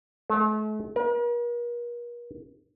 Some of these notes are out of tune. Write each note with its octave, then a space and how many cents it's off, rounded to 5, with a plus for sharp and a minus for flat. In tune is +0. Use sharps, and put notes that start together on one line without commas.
A3 -40
A#4 +45